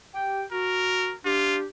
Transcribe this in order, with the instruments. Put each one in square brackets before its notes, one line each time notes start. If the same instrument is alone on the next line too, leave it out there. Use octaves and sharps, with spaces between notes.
[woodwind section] G4 G5
[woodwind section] F#4 [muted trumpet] A#4
[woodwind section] D4 G4 [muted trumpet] F4